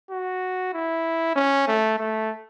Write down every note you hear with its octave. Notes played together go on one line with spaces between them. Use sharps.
F#4
E4
C#4
A3
A3